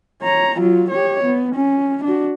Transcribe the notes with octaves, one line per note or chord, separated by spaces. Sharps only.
C#5 A#5
F#3 F4
G4 C#5
B3
C#4
D4 F#4